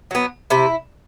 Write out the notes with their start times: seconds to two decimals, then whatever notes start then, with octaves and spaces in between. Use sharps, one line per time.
0.11 F#3 B3
0.50 C3 E4